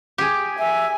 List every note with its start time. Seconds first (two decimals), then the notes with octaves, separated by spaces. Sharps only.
0.18 G4 G#4
0.58 E5 G#5